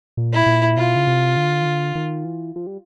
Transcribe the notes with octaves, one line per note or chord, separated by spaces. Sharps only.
A#2
E4
A#2
B2 F4
C#3
C3
D3
D#3
D3
D#3
E3
F3
G3